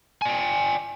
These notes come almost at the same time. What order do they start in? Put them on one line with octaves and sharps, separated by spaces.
G#5 D5 G5